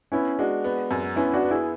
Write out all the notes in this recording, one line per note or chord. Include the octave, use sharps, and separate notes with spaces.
B3 C#4 E4
G#3 D4 F#4
B3
F#2
B3 C#4 E4
D4 F#4
B3
E4 G#4